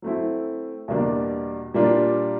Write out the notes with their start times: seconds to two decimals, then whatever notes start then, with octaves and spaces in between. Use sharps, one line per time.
0.02 F#3 A3 C4 E4
0.88 E2 B2 G3 A#3 D4
1.74 A#2 G3 A#3 D4 F4